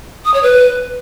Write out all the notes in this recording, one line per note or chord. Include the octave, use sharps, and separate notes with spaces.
D#6
C#5
B4